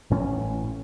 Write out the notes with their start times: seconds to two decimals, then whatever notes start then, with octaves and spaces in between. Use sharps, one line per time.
0.10 A1 A2 C#4